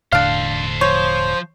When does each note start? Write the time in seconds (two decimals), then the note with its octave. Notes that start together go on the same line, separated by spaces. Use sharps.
0.12 E1 A2 D3 D4 A4 C5 F5
0.81 F3 C5 C#5